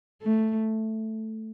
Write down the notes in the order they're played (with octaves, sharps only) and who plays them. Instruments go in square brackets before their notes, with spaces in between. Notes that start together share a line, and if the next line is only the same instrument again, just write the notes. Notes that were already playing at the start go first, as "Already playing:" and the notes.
[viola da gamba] A3